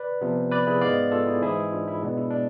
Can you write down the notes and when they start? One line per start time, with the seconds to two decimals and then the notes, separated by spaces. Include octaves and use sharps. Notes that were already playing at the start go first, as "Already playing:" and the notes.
Already playing: B4 D5
0.21 C3 F3 B3
0.51 B4 D5
0.67 E4 G#4
0.81 G#2 G#3 B3 D5 F5
1.11 F4 A4
1.27 E4 G#4
1.42 G#2 E3 G#3 E4 G#4
1.72 D4 F4
1.88 E4
2.02 B2 G#3 B3 D4
2.17 E4
2.31 D4